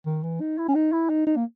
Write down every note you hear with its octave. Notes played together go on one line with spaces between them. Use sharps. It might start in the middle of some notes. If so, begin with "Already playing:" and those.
D#3
E3
D#4
E4
C#4
D#4
E4
D#4
D#4
A#3